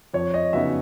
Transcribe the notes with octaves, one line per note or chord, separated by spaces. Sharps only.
F2 C#5
D#5
C#3 F#3 B3 D#4 E5